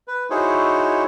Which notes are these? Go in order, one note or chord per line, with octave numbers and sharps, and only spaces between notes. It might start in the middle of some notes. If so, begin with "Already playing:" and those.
B4
D#4 E4 F#4 G#4 C5 C#5